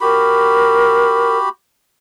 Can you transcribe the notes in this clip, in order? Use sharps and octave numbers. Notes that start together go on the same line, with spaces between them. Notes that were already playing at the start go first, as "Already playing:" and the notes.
F#4 G4 A#4 B5